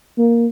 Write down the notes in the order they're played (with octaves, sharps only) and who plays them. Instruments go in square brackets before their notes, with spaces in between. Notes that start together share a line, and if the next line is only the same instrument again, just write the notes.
[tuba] A#3